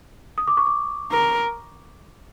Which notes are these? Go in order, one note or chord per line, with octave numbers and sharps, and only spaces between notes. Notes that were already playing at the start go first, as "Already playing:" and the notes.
D#6
D6
C#6
D6
A#4